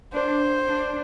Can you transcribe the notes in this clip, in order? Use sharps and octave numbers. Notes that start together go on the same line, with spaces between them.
D4 C5
D4